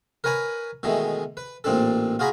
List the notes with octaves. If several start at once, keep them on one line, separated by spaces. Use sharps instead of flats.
A#4 B4 C#5 G#5 A#5 B5
B2 D#3 E3 G#3 A3
B4
A1 A#2 C4 D4 A4
F4 F#4 G#4 A#5 B5